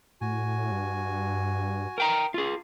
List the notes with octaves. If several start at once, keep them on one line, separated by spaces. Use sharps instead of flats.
A2 F#4 G#5
G2
A#4 G5 A#5
F4 G#4